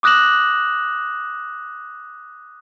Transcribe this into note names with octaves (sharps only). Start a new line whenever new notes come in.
D6 D#6 F#6 A#6 E7 F#7